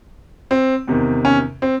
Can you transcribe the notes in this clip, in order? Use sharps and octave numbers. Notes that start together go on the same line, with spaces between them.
C4
E2 C3 D#3
C#4
C4